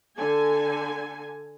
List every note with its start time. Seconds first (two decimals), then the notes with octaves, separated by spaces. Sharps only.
0.18 D3 A4 G#5